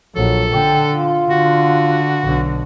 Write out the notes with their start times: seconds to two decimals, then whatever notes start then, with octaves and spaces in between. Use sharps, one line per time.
0.16 A#1 F#3 A4
0.54 D3 G5
0.93 F4
1.30 D3 F#4
2.24 B1 D3